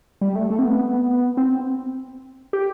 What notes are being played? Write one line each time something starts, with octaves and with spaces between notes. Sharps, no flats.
G3
A3
A3
C4
B3
C4
G4